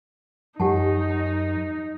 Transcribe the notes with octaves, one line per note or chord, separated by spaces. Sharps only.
F#2 D#4 G4 F#5 A5